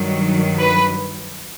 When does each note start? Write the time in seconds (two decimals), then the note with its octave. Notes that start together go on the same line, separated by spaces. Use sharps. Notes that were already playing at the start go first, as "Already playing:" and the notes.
Already playing: G2 D#3 F#3
0.59 B4